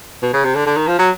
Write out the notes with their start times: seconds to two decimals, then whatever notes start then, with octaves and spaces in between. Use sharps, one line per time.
0.23 B2
0.34 C#3
0.44 C3
0.55 D3
0.66 D3
0.77 D#3
0.88 F3
0.99 F#3